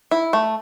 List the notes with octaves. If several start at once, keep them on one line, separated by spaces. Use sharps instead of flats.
E4
A3